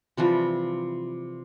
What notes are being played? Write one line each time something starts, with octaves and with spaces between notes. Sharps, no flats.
C3 E3 F3 G3